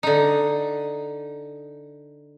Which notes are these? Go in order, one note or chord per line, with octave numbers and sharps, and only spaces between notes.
D3 D#4